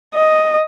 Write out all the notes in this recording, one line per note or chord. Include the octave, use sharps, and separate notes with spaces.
D#5